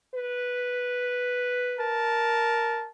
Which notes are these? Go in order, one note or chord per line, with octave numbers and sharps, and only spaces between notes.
B4
A#4 A5